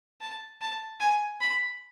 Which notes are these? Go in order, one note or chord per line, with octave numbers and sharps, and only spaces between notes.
A5
A5
G#5
B5